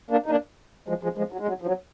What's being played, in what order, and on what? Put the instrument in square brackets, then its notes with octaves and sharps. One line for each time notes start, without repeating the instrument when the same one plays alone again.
[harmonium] A#3 D4
D#4
A#3 D4
F3 G#3
F3 G#3
F3 G#3
F#3
G#3
F#3
F3
F#3